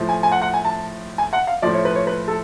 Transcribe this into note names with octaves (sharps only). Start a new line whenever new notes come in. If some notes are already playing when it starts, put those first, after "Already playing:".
Already playing: A2 F3
G#5
G#5
F#5
F#5
G#5
A5
G#5
F#5
F5
A2 F3 D5
C#5
B4
C#5
B4
A4